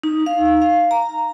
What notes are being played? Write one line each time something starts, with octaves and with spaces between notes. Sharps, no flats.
D#4
F5
F5
A#5